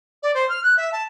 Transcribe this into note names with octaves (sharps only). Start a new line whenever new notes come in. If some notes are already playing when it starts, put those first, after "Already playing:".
D5
C5
F6
F#6
E5
A5